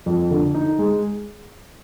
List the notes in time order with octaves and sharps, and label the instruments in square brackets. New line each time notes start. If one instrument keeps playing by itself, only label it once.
[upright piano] F2
D3
D#4
G#3